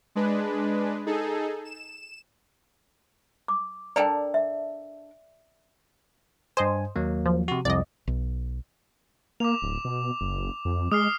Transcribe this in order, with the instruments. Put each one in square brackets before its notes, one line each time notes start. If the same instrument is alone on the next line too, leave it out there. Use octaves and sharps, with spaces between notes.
[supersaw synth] G#3 D4 B4
D#4 G#4 A4
E7
[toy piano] D6
[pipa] D4 A4 A#4 [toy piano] D5 G5
[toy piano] E5
[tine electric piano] G2 G#5 [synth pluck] C5 D#5
[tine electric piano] D#2 F#3 A#3
[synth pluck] F3
[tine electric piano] C3 F#4
[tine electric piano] C2 F2 [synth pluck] D5 D#5
[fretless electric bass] B1
[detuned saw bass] A#3 [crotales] D6 F7
[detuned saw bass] D1
B2
F#1
F2
[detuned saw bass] G#3 [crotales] D#6 F6 C7